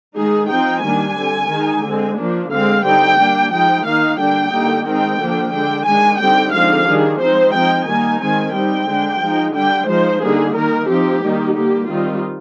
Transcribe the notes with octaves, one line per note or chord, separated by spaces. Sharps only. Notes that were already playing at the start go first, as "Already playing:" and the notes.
D#3 G#3 D#4 G#4
F3 C4 D#4 G5
D#3 G3 A#3 D4 G#5
D3 G3 C4
D#3 G#3 D#4
D3 G#3 C4
F3 A#3 D4
D3 G#3 C4 F5
D3 G3 C4 D#4 G5
G3 A#3 D4
F3 G#3 D#4 G5
D#3 A#3 D#4 F5
D3 G3 A#3 D4 G5
D3 G3 A#3 D#4
D#3 G#3 C4 D#4 G5
D3 F3 A#3 D4
D3 G#3 D4 G5
D#3 G#3 D4 G#5
D3 G3 C4 D#4 G5
D3 F3 G#3 C4 D#4 F5
D#3 G3 D4 G#4
F3 G#3 C4 D#4 C5
F3 C4 D#4 G5
D#3 G3 A#3 D#4 G#5
D#3 G#3 C4 G#5
G3 C4 D#4 G5
D3 G#3 D4
F3 G#3 D#4
D3 G3 D4 G5
F3 G#3 D#4 C5
D3 G3 A#3 D#4 G#4
D#3 A#3 D#4 A#4
F3 C4 D#4 G4
D#3 G3 A#3 D#4
D3 G3 A#3 G4
D#3 G3 C4 D#4 F4